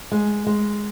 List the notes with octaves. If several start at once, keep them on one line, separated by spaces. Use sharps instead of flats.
G#3
G#3